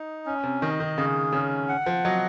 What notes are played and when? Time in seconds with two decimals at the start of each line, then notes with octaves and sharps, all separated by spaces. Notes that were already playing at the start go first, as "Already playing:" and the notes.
Already playing: D#4
0.26 C#4
0.43 C3
0.61 D#3 D#5
0.80 D#3
0.98 C#3 G#4
1.32 C#3 C#4
1.69 F#5
1.86 F3
2.04 F#3 D#5